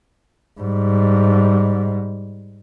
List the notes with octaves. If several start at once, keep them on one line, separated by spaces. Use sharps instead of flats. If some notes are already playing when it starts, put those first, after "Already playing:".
G#2 G3